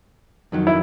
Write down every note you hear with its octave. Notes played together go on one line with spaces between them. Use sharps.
F2 D#3 F#3
E4